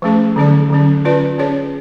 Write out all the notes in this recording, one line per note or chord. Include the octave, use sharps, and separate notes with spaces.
F3 A3 C#4 G#4
D3 F#3 C#4 G#4 D5
D3 F#3 C#4
C#4 F4 B4 D5
C#4 G#4 C#5